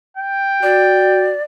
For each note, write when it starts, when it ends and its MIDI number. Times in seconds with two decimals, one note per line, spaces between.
0.17 1.31 79
0.63 1.33 66
0.63 1.42 74